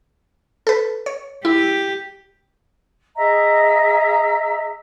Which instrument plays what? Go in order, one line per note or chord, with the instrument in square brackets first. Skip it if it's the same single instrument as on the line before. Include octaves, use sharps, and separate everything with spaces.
[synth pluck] A4 B4
C#5
[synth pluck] E4 [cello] G4
[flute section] G#4 D#5 E5 A#5